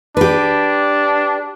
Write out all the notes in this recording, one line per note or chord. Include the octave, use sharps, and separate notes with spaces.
D4 G4 B4